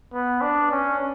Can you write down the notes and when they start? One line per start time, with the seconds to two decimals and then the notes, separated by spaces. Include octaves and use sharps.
0.13 B3
0.41 D4
0.71 C#4